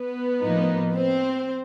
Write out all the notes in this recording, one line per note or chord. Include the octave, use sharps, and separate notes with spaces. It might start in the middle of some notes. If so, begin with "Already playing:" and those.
Already playing: B3 B4
A2 F3 A#3 D#4
C4 C5